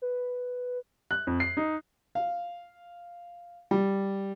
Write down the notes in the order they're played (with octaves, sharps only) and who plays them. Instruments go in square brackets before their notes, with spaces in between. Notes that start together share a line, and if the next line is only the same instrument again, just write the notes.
[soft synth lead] B4
[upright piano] F#6
F2
C7
D#4
[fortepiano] F5
G3